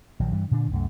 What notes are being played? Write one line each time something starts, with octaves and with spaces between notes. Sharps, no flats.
A#1 D#3 F#3
G2 E3 G3
A#2 D3 C4 D4
C2 F#2 A3